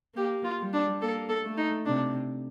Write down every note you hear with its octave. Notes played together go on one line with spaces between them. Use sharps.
A#3 G4
F4
G3
D4
A#3 A4
A4
A3
D#4
C3 D4